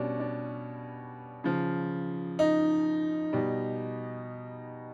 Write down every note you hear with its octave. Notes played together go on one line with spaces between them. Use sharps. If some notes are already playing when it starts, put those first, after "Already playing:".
Already playing: B2 G3 C#4 D4
D4
C#3 F3
D#4
B2 G3